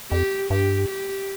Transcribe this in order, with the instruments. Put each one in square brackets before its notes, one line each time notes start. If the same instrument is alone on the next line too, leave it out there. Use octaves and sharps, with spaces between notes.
[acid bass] F2 [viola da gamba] G4
[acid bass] G2 [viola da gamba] G4
[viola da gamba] G4